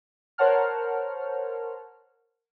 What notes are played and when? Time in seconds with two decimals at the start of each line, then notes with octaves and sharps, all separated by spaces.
0.38 A#4 C5 C#5 F#5 A5 F6